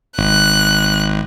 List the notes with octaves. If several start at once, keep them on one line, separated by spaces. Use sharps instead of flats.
G#1 F#6